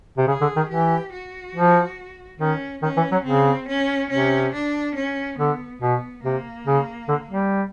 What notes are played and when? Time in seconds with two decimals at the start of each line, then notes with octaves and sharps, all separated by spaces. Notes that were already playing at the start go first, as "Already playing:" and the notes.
0.17 C3
0.27 C#3 G#4
0.41 D3
0.56 D#3
0.69 E3 G4
1.13 F#4
1.55 F3
2.40 D#3 C#4
2.82 D#3 C#4
2.97 E3
3.12 F#3
3.25 C#3 C4
3.68 C#4
4.10 C3 C#4
4.54 D4
4.95 C#4
5.38 D3 B3
5.81 B2 B3
6.24 C3 A#3
6.66 C#3
7.08 D3
7.30 G3